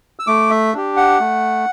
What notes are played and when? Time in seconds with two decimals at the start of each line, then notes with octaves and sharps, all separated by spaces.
0.19 E6
0.27 A3 D6
0.50 E5
0.74 D4 G4
0.97 F#5
1.20 A3